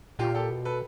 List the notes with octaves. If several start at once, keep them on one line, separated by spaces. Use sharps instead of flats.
A#2 F4 G4
G4 A4
B2
A4 B4